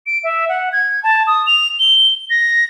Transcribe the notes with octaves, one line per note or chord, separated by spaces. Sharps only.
D7
E5
F#5
G#6
A5
D#6
F7
G7
A#6